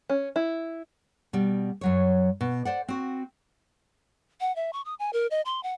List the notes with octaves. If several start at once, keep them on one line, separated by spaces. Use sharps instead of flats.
C#4
E4
B2 G3
F#2 F#3 C#5
B2
C5 D5 F#5
C4 F#4
F#5
E5
C#6
D#6
G#5
A#4
D#5
C6
F#5